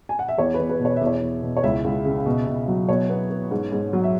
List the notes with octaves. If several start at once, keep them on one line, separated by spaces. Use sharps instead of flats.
G#5
F#5
E5
E2 C#5
E2 B4
B4
B2
C#5
E2 E5
C#5
E2
B2
C#5
C#2 E4 E5
C#2
C#3
B2
B2
F#3
B2 C#5
B3
B3
G#2
G#2
F#3
E5